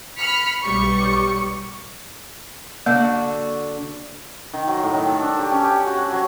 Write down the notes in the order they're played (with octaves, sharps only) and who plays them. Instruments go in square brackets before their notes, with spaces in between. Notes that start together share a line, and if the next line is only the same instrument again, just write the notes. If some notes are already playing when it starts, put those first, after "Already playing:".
[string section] B5 F6 B6 C#7
B1 G3 C#6 C#7
[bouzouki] D3 D4 F#4 [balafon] A#3
[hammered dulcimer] D#3
F#3
A2
D#3
A4
D4
G4
C#4
G4
F#4
F#5
F#3